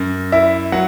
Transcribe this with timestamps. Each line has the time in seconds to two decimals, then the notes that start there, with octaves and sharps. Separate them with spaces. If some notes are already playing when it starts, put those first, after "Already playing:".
Already playing: F#2
0.32 E4 E5
0.72 F#3 F#5